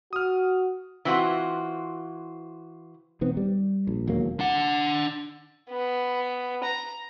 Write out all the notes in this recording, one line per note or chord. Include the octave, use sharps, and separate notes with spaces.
F#4 D#6 F6
E3 C4 F4 F#4
D#1 D#3 B3 C4
G3
A#1
E1 D#2 F#3 A#3
D4 F#5
B3
A#5